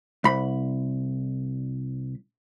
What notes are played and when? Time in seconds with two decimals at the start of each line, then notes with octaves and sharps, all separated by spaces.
0.24 C2 B5